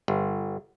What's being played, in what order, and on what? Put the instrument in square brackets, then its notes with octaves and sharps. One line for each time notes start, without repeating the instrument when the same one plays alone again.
[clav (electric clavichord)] G1